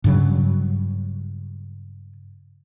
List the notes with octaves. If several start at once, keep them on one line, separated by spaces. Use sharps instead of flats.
G2 C#3 F#3